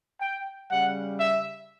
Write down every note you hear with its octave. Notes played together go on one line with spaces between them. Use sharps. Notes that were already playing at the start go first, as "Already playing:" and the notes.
G5
C#3 G3 F#5
E5